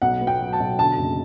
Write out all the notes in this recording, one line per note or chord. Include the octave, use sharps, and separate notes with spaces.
B1 F#5
B3
G5
F#3
A5
B1
D3 A5
F#1